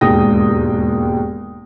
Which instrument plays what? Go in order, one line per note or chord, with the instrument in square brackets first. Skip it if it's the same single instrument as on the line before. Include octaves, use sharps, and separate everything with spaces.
[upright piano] E1 D#2 G#2 G5 D#6 A#6